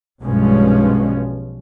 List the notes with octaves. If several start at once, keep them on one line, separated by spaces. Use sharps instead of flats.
B1 G2 B2 F3 G#3 C#4